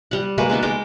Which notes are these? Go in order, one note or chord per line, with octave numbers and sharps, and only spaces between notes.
G3 F#5
G#3 A#3 F#4 B4
G#3 B3 D#4 A4
G#3 A#4 G5 D6